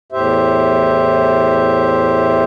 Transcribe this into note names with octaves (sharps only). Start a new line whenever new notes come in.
E2 A2 G4 C5 E5